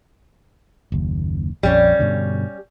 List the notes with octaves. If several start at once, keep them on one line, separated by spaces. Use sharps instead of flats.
F#1 D#2
A#1 F2 G3 C#4
G2 B2 D3